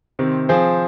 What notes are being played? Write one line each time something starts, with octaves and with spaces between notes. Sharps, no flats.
C3 D#3 C4
F3 C4 G#4 C5